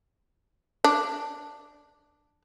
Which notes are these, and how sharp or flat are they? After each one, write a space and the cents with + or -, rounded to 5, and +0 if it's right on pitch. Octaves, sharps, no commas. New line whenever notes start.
D4 +5